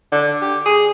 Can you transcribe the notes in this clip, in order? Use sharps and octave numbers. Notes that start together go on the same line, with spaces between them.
D3
G4
G#4